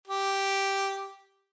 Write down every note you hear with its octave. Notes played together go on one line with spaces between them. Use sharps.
G4